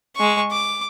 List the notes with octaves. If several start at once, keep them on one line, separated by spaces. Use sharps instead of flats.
G#3 C#6
D6